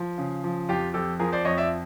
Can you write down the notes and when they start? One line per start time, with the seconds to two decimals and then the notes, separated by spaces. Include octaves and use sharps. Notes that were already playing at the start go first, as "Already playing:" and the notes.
Already playing: F3
0.18 C#3
0.44 F3
0.69 F2 F4 G4
0.94 F2 G4 A4
1.19 F3 G#4 A#4
1.32 C5 D5
1.45 F2 C#5 D#5
1.57 D5 E5